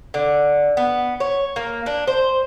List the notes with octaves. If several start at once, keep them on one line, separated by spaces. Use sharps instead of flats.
D3
B3
C#5
A#3
D4
C5